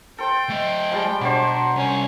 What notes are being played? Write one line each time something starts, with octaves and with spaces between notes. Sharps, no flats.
A4 C5 G5
A3 D#5
F3 G3 G#3
B2 F#3 D4 C5
C2 C#4